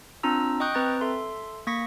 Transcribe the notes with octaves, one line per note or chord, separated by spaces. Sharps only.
C4 D4 F4 A#5 E6
D#5 G5 C#6 D#6 F#6 G6
C4 B4 A#5 A6
A4 E5 C6
A#3 C#6 A#6 B6 C#7